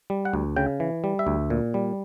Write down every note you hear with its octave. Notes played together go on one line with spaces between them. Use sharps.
G3
F#5
D2
C#3 G5
E3
G3
E5
D2
A#2
G3